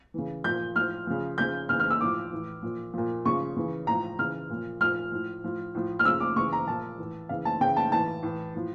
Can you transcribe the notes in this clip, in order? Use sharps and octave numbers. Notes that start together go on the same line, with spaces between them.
C#3 E3
A#2 F3 G6
A2 F3 F6
C#3 F3
C#3 F3 G6
C#3 E3 F6
F6
E6
A2 F3 D6
A2 E3
A#2 F3
A#2 F3
C#3 F3 C#6
C#3 E3
A2 F3 A#5
C#3 E3 F6
A#2 F3
A#2 F3 F6
A2 F3
A2 F3
A2 F3
F6
C#3 F3 E6
D6
C#3 E3 C#6
A#5
A#2 F3 A5
A2 E3
C#3 E3 F5
A5
C#3 E3 G5
A5
A2 E3 A5
A2 E3
A2 F3